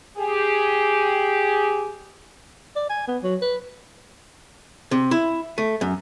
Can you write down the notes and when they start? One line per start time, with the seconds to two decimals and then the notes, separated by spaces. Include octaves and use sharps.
0.17 G4 G#4
2.76 D5
2.90 G#5
3.08 B3
3.23 F#3
3.42 B4
4.91 C3
5.11 E4
5.58 A3
5.81 F#2